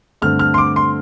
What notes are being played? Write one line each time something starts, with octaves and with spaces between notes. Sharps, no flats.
G2 D3 A3 C4 F6
F6
C6
D6
C6